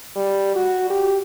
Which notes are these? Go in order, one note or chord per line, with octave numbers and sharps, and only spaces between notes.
G3
F#4
G4